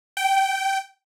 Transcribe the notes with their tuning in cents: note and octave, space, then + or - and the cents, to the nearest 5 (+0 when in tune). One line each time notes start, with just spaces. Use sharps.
G5 -15